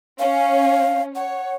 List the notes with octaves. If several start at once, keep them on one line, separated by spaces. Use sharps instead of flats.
C#4 F5
C#5 F#5